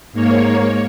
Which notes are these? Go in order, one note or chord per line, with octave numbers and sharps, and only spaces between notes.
G#2 A#3 C#5